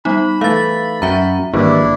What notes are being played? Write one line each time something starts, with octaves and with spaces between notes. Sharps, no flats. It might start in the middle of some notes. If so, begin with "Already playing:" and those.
G3 B3 D#4 B5
E3 A3 F5 A6
F#2 F#4 E5 G5 A#5
G#1 E3 G3 A#3 D4 E4